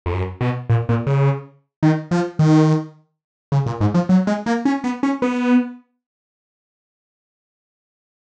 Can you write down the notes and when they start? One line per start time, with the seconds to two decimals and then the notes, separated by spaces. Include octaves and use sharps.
0.06 F2
0.13 F#2
0.41 B2
0.70 A#2
0.89 A#2
1.07 C#3
1.83 D#3
2.11 F3
2.39 D#3
3.52 C#3
3.66 A#2
3.81 G#2
3.94 F3
4.09 F#3
4.27 G#3
4.46 A#3
4.65 C#4
4.84 B3
5.03 C#4
5.22 B3